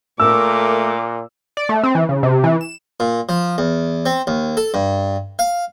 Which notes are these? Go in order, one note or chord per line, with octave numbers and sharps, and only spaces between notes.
A#2 A3 A#4 D6 E6
D5
A3
C4
E3
C#3
C3
E3
E7
A#2
F3
E2
C4
D#2
A4
G2
F5